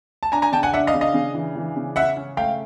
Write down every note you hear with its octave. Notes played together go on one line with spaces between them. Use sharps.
A5
D4 G#5 A#5
G#5 A#5
C#3 G5 A5
F#5 G#5
D4 E5 F#5
D#5 F5
C#3
D#5 F5
C#3
E3
E3
C#3
C#4 E5 F#5
C#4
A3 F5 G5